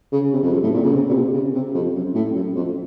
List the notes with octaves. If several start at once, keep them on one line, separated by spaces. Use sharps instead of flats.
C#3
C3
F2
F#2
A2
A#2
C#3
C3
A#2
C3
C#3
C3
F2
F#2
A2
F#2
F2